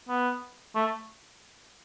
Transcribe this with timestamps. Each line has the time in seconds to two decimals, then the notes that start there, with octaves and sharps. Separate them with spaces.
0.09 B3
0.75 A3